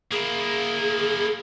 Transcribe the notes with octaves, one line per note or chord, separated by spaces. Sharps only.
A#3 E4 G#4